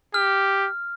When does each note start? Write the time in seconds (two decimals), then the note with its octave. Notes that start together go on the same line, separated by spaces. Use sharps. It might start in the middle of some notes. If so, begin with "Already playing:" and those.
0.14 G4 F6